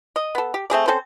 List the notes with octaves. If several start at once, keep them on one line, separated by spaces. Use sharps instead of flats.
D#5
B3 A4
G4
A3 C4 G#4 D5
C4 C#4 A4 C5